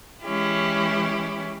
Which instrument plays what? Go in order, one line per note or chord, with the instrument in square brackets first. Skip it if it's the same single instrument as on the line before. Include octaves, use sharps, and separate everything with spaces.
[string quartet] E3 G#3 C#4 E4 G4